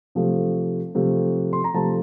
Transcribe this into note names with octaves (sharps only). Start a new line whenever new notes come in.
C3 F3 A3
C3 F3 A3
C6
A#5
C3 F3 A3 A5